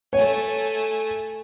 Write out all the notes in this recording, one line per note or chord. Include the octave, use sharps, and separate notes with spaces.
A3 C#5 G#5